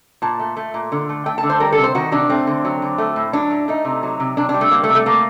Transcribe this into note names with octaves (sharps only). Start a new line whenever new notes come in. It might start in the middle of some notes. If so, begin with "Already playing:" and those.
A#2 A5
A3
A3
A#2
D3
A3
A3 G5
A5
D3
C5
G3 A#4
A4
C3
C5
D#3 F#4
C3 D4
A3 C4
D3
F#3
D3
A3
A2
F#3 D4
A2
A3 D#4
C3
F#3
C3
C3 D4
D4
G3
A3
G3 A#3
A3
C3
A3
A3 A#3